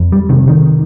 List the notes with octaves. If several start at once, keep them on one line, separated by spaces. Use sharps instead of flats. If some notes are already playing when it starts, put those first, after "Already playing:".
Already playing: F2
G3
C3 D#3
D#3